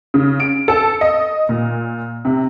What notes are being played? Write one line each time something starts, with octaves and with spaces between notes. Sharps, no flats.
C#3
D7
A4
D#5
A#2
C3